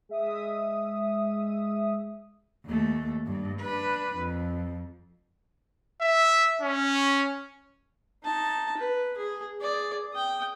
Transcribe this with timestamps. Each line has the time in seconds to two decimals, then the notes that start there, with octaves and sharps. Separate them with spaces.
0.09 G#3 E5 D#6
2.66 D#2 A3
3.26 G2
3.61 D4 B4
4.16 F2
6.01 E5
6.61 C#4
8.23 D#4 A5
8.77 B4
9.17 G#4
9.60 G#4 D5
10.13 G5 D#6